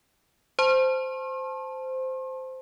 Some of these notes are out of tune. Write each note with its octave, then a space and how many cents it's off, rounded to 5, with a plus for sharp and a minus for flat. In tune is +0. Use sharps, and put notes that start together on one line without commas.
C5 -10 A5 -10 C6 +45